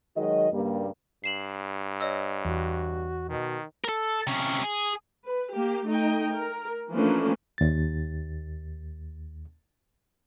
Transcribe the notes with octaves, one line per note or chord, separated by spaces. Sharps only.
D#3 F#3 G#3 F#4 D#5
G2 C#3 G3 A#3
G2 C7 E7 F#7
C#5 D#5 E6
E2 F#4
B2 D#3
A4 A#4
C3 C#4
G#4
B4
A#3 G4
A3 D#4 D#5 G5
A#4
E3 F3 A3 A#3 C#4 D4
D#2 A6